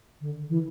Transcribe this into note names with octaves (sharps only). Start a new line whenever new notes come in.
D3
E3